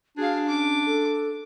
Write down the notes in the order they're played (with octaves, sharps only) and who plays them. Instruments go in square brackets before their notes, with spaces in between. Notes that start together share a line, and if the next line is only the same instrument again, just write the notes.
[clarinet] D4 [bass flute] F#4 [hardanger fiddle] G#4 F5
[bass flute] C#4 [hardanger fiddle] D6
[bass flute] A4